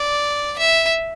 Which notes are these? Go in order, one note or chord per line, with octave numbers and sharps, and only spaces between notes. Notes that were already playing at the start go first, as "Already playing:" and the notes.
Already playing: D5
E5